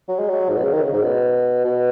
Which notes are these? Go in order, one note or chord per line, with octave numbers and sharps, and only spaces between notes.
F#3
G#3
F#3
G#2
B2
C#3
D#3
C#3
G#2
B2
B2